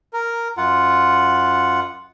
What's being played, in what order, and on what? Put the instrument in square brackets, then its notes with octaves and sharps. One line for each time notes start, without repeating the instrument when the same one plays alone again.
[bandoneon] A#4
F#2 F4 F#5